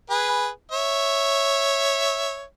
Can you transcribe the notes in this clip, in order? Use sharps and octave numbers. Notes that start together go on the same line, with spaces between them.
G#4 B4
C#5 E5